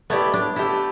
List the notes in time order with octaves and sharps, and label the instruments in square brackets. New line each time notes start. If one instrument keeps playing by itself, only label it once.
[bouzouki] A3 E4 G4 D5 [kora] B3
[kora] D4
[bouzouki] D3 A3 G4 [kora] E4